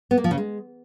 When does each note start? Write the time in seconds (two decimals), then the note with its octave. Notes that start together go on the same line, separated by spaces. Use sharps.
0.11 B3
0.18 A#3
0.24 F3
0.31 C#3
0.38 G#3